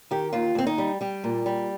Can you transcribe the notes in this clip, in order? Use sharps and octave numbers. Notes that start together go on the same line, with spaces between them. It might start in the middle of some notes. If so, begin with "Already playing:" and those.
D#3 G4
D#2 F4
D#2 C4
D#4
G3
G3 G4
A#2
G3